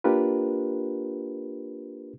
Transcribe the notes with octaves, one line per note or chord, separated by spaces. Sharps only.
A#3 D4 F4 G4 A#4 B4